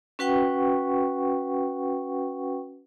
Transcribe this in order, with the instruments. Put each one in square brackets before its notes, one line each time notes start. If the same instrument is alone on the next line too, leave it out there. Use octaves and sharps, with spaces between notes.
[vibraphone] C#4 F#4 B4 F#5 G5 C#6